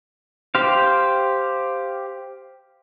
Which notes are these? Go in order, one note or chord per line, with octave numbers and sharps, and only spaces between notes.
G4 C5 F5